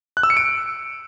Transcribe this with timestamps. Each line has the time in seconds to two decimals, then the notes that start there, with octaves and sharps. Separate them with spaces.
0.17 F#6
0.23 E6
0.30 C#7
0.37 D7